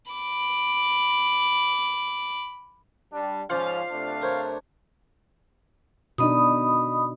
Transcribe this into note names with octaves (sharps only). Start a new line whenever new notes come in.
B5 D6
G3 D4
G#2 F3 C#4 F4 C5 D5 F5
C3 A3 D4
A#4 C5 C#5
B2 D4 D#4 D#5 B5 D#6